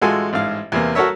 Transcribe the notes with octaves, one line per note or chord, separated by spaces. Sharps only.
A1 G#3 F4 F#4 A4 G#5
A1 G#2 F5
E2 C3 E3 A#3
F#4 A4 A#4 C#5 E5